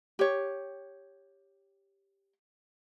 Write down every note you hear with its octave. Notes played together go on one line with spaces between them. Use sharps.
G4 C#5